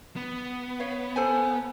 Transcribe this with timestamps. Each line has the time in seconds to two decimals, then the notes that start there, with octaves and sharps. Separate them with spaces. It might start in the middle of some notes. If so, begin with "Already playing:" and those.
0.16 B3
0.80 C#5 F5
1.16 A4 C5 G#5